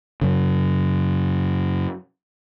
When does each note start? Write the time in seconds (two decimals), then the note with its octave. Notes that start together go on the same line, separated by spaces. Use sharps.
0.21 F#2 C#3